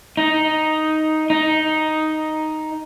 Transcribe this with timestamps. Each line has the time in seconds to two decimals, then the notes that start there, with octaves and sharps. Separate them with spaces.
0.17 D#4
1.30 D#4